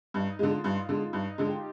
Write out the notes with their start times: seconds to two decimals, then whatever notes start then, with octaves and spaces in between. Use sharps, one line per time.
0.14 G2 D#4
0.39 D3 G#3 F4
0.64 G2 F4
0.89 D3 G#3
1.13 G2 D#4
1.36 D3 G#3 F4
1.46 G4